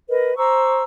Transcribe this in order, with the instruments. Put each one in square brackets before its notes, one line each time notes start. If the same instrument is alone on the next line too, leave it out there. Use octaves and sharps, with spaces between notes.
[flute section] A#4 B4 D#5
C5 A#5 C#6 E6